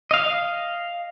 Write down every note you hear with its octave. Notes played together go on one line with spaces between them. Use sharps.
D#5 F5